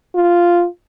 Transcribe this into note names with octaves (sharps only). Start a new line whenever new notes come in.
F4